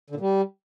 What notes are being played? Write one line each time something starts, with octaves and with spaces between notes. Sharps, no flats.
D3
A#2
G3